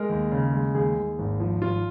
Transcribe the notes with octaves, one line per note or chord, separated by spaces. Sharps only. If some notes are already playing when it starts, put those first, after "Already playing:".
Already playing: G#3 A#4
D#2
C#3
G#3
D#2 G#4
D#2
G#1
F3
G#1 F4